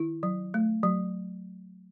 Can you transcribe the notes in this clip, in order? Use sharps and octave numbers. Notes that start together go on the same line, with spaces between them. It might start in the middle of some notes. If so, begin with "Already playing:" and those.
Already playing: D#3 E4
F#3
A3
F#3